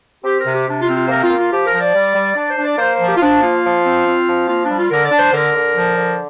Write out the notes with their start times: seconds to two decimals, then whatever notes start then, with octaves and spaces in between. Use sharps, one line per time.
0.24 C4 G4
0.38 A#4
0.45 C3
0.52 G4
0.66 C3 D4
0.81 F4
0.87 C4
0.94 F4
1.04 C5
1.09 A#3 A#4
1.22 F4
1.30 A#3
1.37 F4
1.51 F3 G4
1.65 A#4
1.72 F3
1.80 D5
1.94 G3
2.14 G3
2.35 D4 D5
2.50 C5
2.58 D4
2.64 D5
2.78 A#3 C5
2.93 C5
2.99 F3
3.06 G4
3.17 F4
3.21 F3 D4
3.42 A#3 F4
3.64 F3
3.84 C4
4.06 C4
4.27 F3
4.47 A#3 F4
4.62 D4
4.70 G3
4.77 F4
4.90 D3 A#4
5.04 D5
5.11 D4
5.18 C5
5.32 D3 A#4
5.54 D3
5.75 F3
5.96 D3